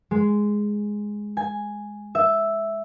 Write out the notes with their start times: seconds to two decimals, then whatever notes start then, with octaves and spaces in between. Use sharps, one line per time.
0.11 G#3
1.37 G#5
2.15 E5